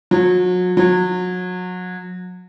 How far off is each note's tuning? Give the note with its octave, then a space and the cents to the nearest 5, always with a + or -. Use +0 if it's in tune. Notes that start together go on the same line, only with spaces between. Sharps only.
F#3 -35
F#3 -30